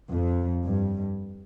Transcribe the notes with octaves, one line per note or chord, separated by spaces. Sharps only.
F2
G2